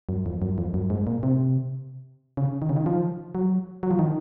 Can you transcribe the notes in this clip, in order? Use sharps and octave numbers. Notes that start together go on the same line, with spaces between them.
F#2
F2
F#2
F2
F#2
G#2
A#2
C3
C#3
D#3
C#3
D#3
F3
F#3
F#3
F3
D#3